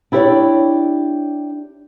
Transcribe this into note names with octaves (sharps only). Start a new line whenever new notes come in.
D4 E4 G4 B4 C#5 D5